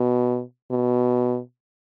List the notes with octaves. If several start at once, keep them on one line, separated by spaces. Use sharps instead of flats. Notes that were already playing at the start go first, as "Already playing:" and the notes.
Already playing: B2
B2